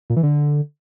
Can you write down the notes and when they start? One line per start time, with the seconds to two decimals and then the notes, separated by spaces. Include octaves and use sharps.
0.10 A#2
0.16 E3
0.23 D3